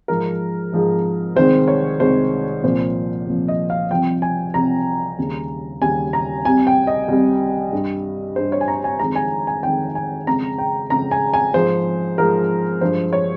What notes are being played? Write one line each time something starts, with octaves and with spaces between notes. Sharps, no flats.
G#2 F3 G#3 A#4
G#2 F3 G#3
C2 C3 D#3 G#3 C5
C#5
C2 C3 D#3 G#3 C5
C2 A#2 F3 C5
C2 A#2 F3
D#5
F5
C2 C3 F3 G5
G#5
C2 C3 F3 A#5
D#2 C#3 G3
D#2 C#3 G3 G#5
A#5
C2 C3 G3 G#5
G5
D#5
C2 C3 G3
G2 G3
G2 G3 C5
C#5
G#5
A#5
G#5
F2 D#3 G#3 A#5
G#5
G#5
F2 D#3 G#3 G5
G#5
F2 C#3 G#3 A#5
G5
F2 C#3 G#3 A#5
G#5
G#5
G#2 F3 G#3 C5
G#2 F3 G#3 A#4
G2 F3 G#3 C5
C#5